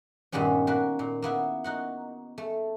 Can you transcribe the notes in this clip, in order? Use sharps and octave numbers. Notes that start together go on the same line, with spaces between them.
G2 A#2 D#3 G3 B3 C#4
A#3 F#4 B4
A#2
A#3 B3 E4 E5
D#4 F#4 F#5
A3